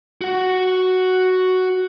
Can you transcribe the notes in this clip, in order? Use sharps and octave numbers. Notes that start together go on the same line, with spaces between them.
F#4 F#5